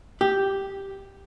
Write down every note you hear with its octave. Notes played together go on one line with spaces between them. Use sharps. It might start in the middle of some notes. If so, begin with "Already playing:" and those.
G4